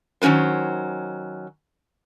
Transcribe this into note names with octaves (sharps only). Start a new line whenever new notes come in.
D#3 F#3 C#4 B4 C5